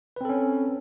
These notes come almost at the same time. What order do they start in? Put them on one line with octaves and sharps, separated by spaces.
B4 C4 A4 C#4